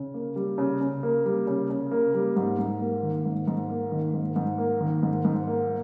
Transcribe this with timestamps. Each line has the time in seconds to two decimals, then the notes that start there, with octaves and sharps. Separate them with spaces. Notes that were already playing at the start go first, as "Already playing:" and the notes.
Already playing: C#3
0.14 A#3
0.36 G3
0.58 C#3
0.80 C#3
1.03 A#3
1.25 G3
1.47 C#3
1.70 C#3
1.91 A#3
2.14 G3
2.36 G#2
2.59 G#2
2.80 A#3
3.02 D#3
3.25 G#2
3.47 G#2
3.70 A#3
3.92 D#3
4.13 G#2
4.36 G#2
4.58 A#3
4.80 D#3
5.03 G#2
5.25 G#2
5.48 A#3